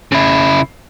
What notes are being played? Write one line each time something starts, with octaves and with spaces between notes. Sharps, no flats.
C#3 E4